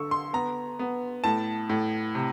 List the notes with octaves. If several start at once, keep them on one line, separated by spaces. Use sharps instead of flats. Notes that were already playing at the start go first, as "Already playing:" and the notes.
Already playing: D3 C#6 E6
C6
B3 A#5
B3
A2 A5
A2
C3